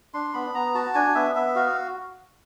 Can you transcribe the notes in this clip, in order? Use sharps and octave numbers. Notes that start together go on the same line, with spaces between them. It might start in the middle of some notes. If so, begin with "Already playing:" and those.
D4 C6
B3 B5
B3 A#5
F#4 A5
D4 G#5
B3 E5
B3 E5
F#4 F5